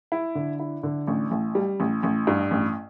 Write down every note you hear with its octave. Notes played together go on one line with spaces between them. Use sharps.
E4
D3
E4
D3
A1
A1
G3
A1
A1
G2
A1